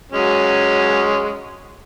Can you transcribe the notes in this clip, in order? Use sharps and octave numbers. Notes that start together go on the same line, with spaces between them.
F#3 G#3 C#4